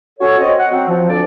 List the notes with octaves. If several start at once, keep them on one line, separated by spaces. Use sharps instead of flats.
C#4 F#4 A4 C#5
C4 C#5 D#5
F#5
F#3 C4
F3
D2 D5